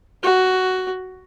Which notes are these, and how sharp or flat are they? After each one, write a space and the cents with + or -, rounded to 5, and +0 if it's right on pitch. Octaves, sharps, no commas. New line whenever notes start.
F#4 +10